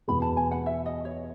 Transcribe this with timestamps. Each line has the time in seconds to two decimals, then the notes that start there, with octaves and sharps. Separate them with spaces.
0.08 E2 B2 G#3 B3 B5
0.22 A5
0.37 G#5
0.51 F#5
0.66 E5
0.86 D#5
1.05 C#5